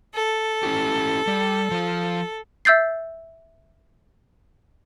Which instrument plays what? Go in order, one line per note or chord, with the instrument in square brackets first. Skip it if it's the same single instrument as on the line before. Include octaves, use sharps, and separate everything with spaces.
[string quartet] A4
[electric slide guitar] C#4 E4 G4
G3
F3 F4
[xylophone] E5 E6 G6 A6 C7